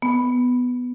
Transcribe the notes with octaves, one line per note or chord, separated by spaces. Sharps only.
B3